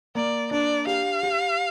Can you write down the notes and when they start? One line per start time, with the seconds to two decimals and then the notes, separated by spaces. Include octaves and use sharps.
0.15 A#3 D5
0.51 D4 D5
0.87 G4 F5
1.23 G4